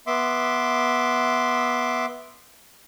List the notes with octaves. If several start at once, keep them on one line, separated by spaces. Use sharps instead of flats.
B3 E5 C6 D6